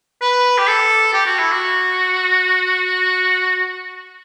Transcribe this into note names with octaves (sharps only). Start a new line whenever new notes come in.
B4
G4
A4
G4
F#4
E4
F#4